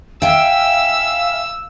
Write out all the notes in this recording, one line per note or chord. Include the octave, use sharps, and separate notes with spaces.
E5 F5 G5 G#5 E6